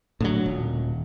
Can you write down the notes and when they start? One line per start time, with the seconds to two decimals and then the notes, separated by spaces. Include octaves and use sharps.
0.21 A2 D3 F#3
0.46 D#1